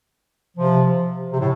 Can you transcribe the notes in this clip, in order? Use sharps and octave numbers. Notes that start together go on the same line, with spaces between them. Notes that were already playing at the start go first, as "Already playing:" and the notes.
C3 F3
C3
A2